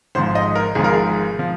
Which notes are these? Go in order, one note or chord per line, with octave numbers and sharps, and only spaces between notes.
G#1 G#2 F3 C5
D#5
A#4
G#1 G#2 F3 G#4
A#4
G#4
F3